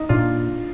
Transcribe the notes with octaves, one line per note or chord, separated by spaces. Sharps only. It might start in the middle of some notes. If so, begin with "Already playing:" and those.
Already playing: D#4
A#2 D4 F4